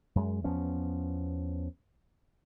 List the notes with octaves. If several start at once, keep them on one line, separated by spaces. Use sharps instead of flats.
F#2 G#3
E2 F3 B3 C#4